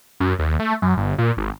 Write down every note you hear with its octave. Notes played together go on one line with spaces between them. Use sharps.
F#2
D#2
A3
F#2
G1
A#2
G#1